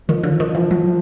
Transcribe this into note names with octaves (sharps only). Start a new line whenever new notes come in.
D#3 F3
D3 F#3
F3
D#3
F3
E3
F#3